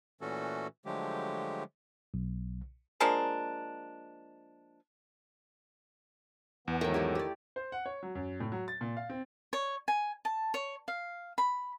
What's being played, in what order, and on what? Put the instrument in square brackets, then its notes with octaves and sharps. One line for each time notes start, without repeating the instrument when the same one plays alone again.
[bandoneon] A#2 E3 A3 C#4 F#4 A4
D3 F3 F#3 G#3 A3 G4
[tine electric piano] B1
[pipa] F3 G#3 A#3 D4
[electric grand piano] E2 [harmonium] E3 B3
[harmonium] G#2 F#3 [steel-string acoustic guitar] D#3 [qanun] A3 G5
[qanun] A3 E4 G4
G4 D5
[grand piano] C5
F#5
C#5
F#3
F#2
A2
F#3
A6
A#2
F5
C4
[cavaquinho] C#5
G#5
A5
C#5
F5
B5